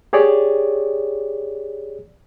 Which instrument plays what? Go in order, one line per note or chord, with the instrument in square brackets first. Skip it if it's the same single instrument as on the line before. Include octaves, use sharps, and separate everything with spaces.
[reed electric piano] G4 G#4 C#5 D5